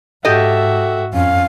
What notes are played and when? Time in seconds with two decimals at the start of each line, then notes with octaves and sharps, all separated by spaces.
0.25 G#2 F#4 G4 A4 D#5 E5
1.14 F2 C#4 F5